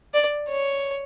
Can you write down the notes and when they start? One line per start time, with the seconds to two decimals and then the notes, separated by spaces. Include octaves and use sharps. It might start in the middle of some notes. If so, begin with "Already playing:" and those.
0.14 D5
0.49 C#5